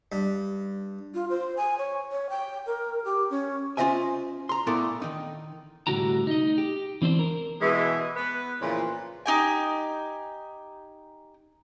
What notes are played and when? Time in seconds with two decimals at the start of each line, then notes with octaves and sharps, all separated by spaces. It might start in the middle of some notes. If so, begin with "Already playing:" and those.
0.12 G2
1.14 F4
1.30 C5
1.57 G#5
1.78 C#5
2.12 C#5
2.30 G5
2.66 A#4
3.05 G4
3.30 C#4
3.77 C#4 F4 C5 D#5 E5 G#5
4.49 A#5 C6
4.67 A#2 A3 B3 E4 A4 A#4
5.02 D#3 D#4
5.87 C2 A2 D3 F#4 G4 A#5
6.27 D#4 D#5
6.58 G4
7.02 E3 C4 D4 C5
7.19 A#4
7.61 B2 E3 G#3
8.16 B3 B4
8.61 A#2 C#3 E3 F3
9.26 D#4 G4 G#5